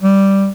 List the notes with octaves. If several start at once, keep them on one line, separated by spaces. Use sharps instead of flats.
G3